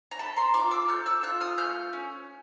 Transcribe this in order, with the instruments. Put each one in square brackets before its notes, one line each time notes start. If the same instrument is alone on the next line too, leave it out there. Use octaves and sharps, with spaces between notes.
[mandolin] A#5
A4 A5 B5
A#5 C6
F4 C6 D6
D6 E6
A4 F6 G6
E6 F#6
F4 E6 F#6
D#6 F6
A3 F6 G6
C#4